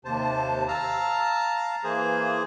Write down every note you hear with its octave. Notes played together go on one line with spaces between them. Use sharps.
D#2 C3 C5 A5
F5 A5 A#5 E6
E3 A#3 G#4 C5